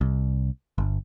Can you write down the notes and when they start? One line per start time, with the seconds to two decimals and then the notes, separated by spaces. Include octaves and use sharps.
0.01 C2
0.78 G1